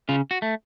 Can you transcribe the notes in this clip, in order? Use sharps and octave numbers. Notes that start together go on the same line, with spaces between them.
C#3 F4
F#4
A3